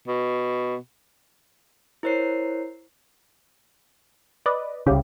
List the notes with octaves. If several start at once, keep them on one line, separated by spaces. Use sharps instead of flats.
B2
E4 A#4 C5 C#5 C7
B4 D5 D#5
C2 C#3 C#4 G4